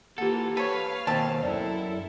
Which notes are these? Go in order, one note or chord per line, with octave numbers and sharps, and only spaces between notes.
E3 A#3 F4 G4 A4 F#5
A4 B4 C#5 F5
D#2 B2 C4 A5
F#2 E4 A4 D5